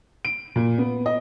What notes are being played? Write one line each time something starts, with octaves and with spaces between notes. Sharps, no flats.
D7
A#2
B3
D#5